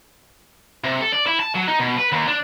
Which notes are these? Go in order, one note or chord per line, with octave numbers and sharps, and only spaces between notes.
C3
A4
D5
E4
A5
F#3
D#4
B2
B4
D#2
D4